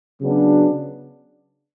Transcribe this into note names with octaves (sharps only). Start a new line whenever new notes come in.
C#3 F#3 B3 D4